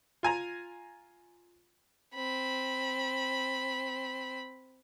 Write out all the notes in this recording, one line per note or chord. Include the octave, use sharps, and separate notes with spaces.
F4 G#5 A#5
C4 B5